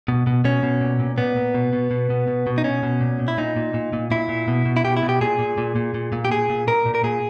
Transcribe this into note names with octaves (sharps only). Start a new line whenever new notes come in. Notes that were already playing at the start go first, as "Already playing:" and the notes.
B2
B2
B2 C#4
B2
A#2
A#2
A#2 B3
A#2
B2
B2
B2
B2
B2
B2
D#4
B2 C#4
B2
A#2
A#2
E4
A#2 D#4
A#2
A#2
A#2
A#2 E4
A#2
B2
B2
E4
B2 G4
E4
B2
G4
A#2 G#4
A#2
A#2
A#2
A#2
A#2
G4
A#2 G#4
A#2
A#2 A#4
A#2
A#4
A#2 G#4